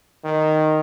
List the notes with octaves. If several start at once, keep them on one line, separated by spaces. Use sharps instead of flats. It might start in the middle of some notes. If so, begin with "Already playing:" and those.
D#3